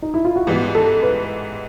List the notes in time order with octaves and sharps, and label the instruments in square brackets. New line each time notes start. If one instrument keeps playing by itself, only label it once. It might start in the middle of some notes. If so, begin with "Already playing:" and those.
[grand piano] D#4
E4
F4
F#4
[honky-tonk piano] G#2 E3 G3 B3 [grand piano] G4
[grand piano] A4
B4